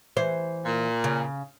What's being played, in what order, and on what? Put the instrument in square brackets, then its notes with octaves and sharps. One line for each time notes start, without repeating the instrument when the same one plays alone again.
[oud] E3 C5
[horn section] A#2
[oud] C#3